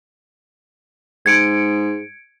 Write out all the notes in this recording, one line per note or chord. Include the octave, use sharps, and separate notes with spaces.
G#2 G#6 C#7 D7